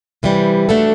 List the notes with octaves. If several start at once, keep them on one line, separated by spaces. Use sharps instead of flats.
C3 E3 G3
A3 D4 F#4 A4